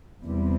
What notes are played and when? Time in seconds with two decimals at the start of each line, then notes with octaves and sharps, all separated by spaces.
0.24 E2 C3 G3